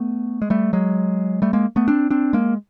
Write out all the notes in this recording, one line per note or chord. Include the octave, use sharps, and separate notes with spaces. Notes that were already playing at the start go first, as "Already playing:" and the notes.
Already playing: A3 B3
G#3
G3 A3
F#3 G#3
G3 A3
G#3 A#3
A3 B3
C4 D4
C4 D4
G#3 A#3